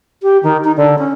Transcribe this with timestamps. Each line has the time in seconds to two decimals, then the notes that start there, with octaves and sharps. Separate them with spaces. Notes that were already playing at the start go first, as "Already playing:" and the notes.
0.23 G4
0.43 D#3
0.64 D#4
0.77 D3
0.98 C#4